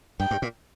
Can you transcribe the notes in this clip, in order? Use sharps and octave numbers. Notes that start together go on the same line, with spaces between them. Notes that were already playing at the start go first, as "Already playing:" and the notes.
G2 G5
G2
A#2